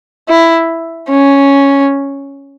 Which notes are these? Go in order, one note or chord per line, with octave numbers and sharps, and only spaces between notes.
E4
C#4